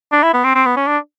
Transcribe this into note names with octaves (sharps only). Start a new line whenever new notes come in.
D4
E4
B3
C4
C4
B3
C#4
D4